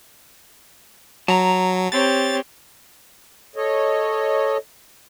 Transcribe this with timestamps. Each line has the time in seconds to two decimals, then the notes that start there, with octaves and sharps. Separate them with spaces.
1.28 F#3 A5 A#5
1.92 C4 G4 C#5 A6
3.56 A4 C#5 D#5